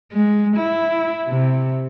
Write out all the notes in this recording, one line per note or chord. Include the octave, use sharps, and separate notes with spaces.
G#3
E4
C3